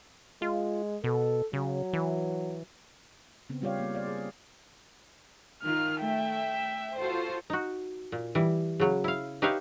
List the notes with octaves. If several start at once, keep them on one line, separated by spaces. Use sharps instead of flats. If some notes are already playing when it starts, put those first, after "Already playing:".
G#3 F4
B2 A4
C#3 F#3
E3
C#3 B3 C4
G3 F4 G4 C#5 D5 F5
A#3
C5 D5 F5
G#4
D#3 F4 F6
A3 E5 G5
F4 F#4 A4 C5
D#4 F#4
A#2
E3 G3
C#3 F#3
E4 F5
D#4 G4 B4 C#5 E5 F5